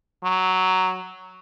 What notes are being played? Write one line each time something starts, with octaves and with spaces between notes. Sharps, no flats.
F#3